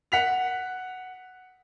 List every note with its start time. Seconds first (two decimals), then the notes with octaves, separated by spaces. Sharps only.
0.12 F#5 B6 F7